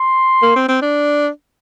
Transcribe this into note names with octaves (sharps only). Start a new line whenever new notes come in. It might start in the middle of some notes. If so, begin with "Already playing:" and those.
Already playing: C6
A#3
C4
C4
D4